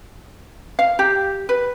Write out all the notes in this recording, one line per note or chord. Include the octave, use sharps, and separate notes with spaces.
F5
G4
B4